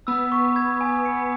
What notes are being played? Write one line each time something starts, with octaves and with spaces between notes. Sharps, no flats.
B3 E6
C#6
G#6
G#5
C#7